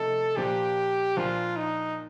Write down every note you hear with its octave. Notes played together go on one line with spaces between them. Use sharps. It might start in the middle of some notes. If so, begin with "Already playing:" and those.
Already playing: C3 F3 A3 D#4 A4
A#2 F3 A#3 D4 G4
A#2 F3 A#3 D4 F4
D#4